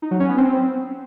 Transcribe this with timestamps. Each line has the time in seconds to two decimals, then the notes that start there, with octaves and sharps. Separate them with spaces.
0.02 D#4
0.11 F#3
0.20 C#4
0.29 B3
0.37 C4